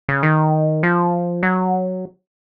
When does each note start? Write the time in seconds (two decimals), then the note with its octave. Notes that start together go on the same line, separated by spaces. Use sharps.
0.09 C#3
0.23 D#3
0.83 F3
1.43 F#3